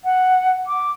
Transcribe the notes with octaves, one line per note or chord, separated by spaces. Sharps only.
F#5
D6